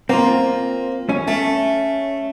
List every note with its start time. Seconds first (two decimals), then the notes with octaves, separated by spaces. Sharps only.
0.09 A#3 C4 F4
1.09 C#4
1.28 A3